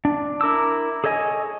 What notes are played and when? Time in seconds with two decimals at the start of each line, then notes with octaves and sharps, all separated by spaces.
0.05 D4
0.41 E4 A#4 D6 E6
1.04 G#4 A4 C#5 D#5 G#5